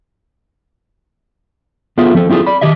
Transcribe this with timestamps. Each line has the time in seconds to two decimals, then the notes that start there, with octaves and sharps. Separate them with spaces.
1.98 B3 F4 G#4 A4 E5
2.14 F3 C4 A4
2.29 C4 E4 F4 G#4 A4
2.47 D5 B5
2.61 D#3 G4 D#5 E5